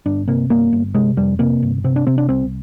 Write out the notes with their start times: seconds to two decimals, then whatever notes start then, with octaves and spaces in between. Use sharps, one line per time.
0.06 G1 D4
0.27 C3 A#3
0.50 G1 A#3
0.73 G1
0.94 C3 G#3
1.17 F2 G3
1.39 C3 A#3
1.62 G1
1.84 C3 C4
1.96 D4
2.07 C3 C4
2.18 D4
2.29 C2 C4